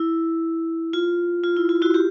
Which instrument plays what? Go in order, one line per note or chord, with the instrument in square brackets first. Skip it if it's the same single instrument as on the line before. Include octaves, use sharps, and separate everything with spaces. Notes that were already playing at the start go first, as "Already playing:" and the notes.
Already playing: [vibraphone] E4
F4
F4
E4
F4
E4 F#4
F4 G4